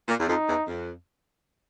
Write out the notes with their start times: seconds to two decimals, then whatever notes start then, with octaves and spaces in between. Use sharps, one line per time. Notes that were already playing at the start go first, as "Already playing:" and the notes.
0.09 A#2
0.20 E2
0.29 F2 D#4
0.49 E2
0.67 F2